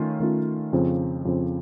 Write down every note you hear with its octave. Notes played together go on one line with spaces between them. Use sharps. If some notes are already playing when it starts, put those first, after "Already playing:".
Already playing: D#3 A3 C#4 F4
D#3 A3 C#4 F4
F2 C#3 F3 C4
F2 C#3 F3 C4